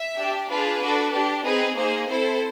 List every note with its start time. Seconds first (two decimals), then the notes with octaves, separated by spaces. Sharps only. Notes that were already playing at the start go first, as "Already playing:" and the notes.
Already playing: E5
0.17 D4 G4
0.49 D4 F4 G#4 B4
0.81 D4 F#4 A4
1.12 D4 G4
1.44 C4 D#4 G#4 B4
1.76 A#3 D#4 G#4 C5
2.07 C4 E4 A4 C5